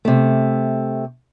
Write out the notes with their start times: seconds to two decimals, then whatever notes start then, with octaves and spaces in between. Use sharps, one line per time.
0.05 C3 A3